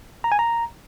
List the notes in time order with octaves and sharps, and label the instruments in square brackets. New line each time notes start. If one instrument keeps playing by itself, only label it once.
[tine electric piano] A#5
G#5
A#5